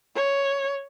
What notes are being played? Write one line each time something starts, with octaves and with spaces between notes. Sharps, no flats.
C#5